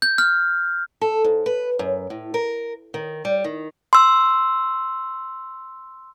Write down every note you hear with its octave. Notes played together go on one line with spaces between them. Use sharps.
G6
F6
A4
G#2
B4
F#2
A2
A#4
D#3
G3
D#3
C6 E6